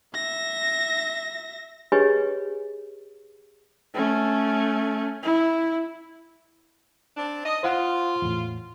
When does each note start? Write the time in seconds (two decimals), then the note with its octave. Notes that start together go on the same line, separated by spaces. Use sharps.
0.15 E5 A#6
1.92 G4 G#4 B4 C#5 D#5 G#5
3.94 A3 C#4
5.23 E4
7.16 C4 D4
7.45 D#5
7.63 F4 C5 F5 F#5
8.22 E2 A2